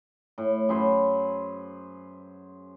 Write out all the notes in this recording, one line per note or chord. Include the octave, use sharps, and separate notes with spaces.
A2
F#2 G#4 B4 C5